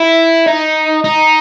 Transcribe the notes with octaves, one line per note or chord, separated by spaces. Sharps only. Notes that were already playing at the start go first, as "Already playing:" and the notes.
Already playing: E4
D#4
D#4